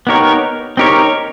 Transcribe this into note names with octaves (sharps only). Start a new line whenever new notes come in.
B3 D#4 G4 A#4 C#5
C4 D#4 G4 A#4 C#5